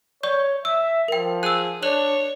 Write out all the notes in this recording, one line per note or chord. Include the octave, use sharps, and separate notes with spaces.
C#5 D5 C#6 G6
E5 E6
F3 A#4 G5
G#4 E6 F#6
D4 C#5 F#6 F#7